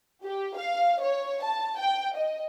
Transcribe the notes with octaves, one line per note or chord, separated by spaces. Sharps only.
G4
F5
C#5
A5
G5
D#5